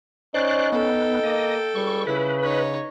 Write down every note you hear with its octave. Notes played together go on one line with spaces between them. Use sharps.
C#4 D#4 C5 D5 F#6
B3 A4 G5
A#3 D#5
C#2 G3 C#6
C#3 E4 B4
D#4 C#5